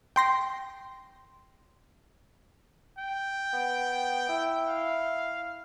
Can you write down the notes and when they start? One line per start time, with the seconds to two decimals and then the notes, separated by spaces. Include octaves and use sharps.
0.16 G5 C6 A#6
2.99 G5
3.53 B3
4.29 E4
4.68 F5